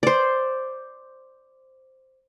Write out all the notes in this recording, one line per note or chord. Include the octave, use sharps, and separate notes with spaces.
C5 D5